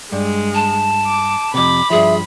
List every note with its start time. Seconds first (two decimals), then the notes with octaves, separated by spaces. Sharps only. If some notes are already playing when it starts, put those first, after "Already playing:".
0.12 G2 G#3
0.54 A5
1.06 D6
1.54 F2 C3 B5 D6
1.90 G2 F3 G#4 E5